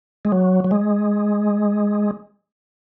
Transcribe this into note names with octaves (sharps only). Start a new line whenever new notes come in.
G#3
F#3
F#3
G#3